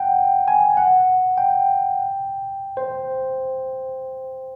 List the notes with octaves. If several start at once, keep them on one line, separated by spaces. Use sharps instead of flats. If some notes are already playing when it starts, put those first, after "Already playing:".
Already playing: F#5 G5
G#5
F#5
G5
C5